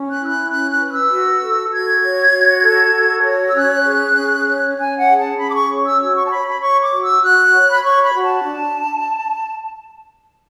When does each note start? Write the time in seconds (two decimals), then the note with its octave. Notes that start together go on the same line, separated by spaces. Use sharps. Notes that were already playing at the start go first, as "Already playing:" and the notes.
Already playing: C#4
0.08 F#6
0.19 E4
0.25 E6
0.29 F#6
0.49 C#4 F#6
0.70 F#6
0.80 B4
0.86 F#6
0.90 E6
1.10 F#4
1.41 A4
1.71 F#4 G#6
2.02 C#5
2.34 F#4
2.63 A4
2.94 F#4
3.24 C#5
3.47 E6
3.55 C#4 F#6
3.85 G#4
4.16 C#4
4.47 C#5
4.77 C#4 G#5
4.97 F#5
5.08 G#4
5.19 A5
5.38 C#4 B5
5.49 D6
5.54 C#6
5.69 C#5
5.84 E6
6.00 F#4 E6
6.15 C#6
6.25 A5
6.31 C#5 B5
6.46 B5
6.60 C#5 C#6
6.81 D6
6.92 F#4
7.02 E6
7.22 F#4 F#6
7.53 C#5
7.71 B5
7.83 C#5 C#6
8.04 B5
8.14 F#4
8.24 A5
8.44 D4